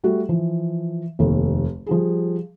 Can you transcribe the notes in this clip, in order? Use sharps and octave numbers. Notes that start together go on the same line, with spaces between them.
G3 A3 F#4
E3 F3
F1 D#2 A4
F3 G3 G#4